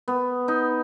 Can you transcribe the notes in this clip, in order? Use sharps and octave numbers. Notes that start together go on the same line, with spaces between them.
B3
D#4